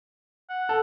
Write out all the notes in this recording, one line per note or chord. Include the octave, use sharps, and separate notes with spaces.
F#5
A4